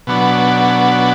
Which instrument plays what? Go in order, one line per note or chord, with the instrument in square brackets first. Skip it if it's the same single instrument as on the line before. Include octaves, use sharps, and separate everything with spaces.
[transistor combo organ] B2 F#3 B3 D4